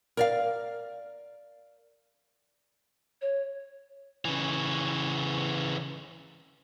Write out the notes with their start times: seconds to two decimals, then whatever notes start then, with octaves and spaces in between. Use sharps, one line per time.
0.17 A#4 D5 F5
3.21 C#5
4.25 C#3 E3